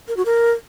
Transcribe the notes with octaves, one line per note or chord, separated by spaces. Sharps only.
A#4
F#4
A#4